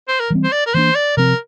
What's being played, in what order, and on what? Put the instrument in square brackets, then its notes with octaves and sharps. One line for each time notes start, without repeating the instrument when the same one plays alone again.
[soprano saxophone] C5
A#4
[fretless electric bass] E3 G3 C4
[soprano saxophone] C5
D5
A#4
[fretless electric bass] E3 A#3 D4 [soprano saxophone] C5
[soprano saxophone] D5
[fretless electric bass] C3 F3 C4 [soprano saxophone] A#4